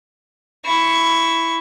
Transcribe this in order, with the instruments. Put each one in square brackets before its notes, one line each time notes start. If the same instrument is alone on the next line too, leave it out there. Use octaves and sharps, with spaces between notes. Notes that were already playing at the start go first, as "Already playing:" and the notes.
[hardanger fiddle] E4 C#6